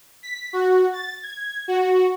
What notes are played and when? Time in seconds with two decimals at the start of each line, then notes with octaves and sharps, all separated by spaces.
0.23 B6
0.53 F#4
0.93 A6
1.23 G#6
1.68 F#4